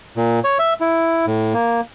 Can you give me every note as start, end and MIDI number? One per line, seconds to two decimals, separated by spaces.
0.17 0.40 46
0.44 0.58 73
0.59 0.74 76
0.81 1.26 64
1.27 1.53 45
1.54 1.81 58